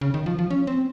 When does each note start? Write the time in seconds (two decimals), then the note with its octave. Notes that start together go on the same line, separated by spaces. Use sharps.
0.01 C#3
0.14 D#3
0.26 F3
0.39 F3
0.51 C#4
0.67 C4